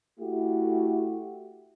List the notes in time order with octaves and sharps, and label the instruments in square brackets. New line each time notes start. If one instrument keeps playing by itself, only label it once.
[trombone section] A3 E4 F#4 G4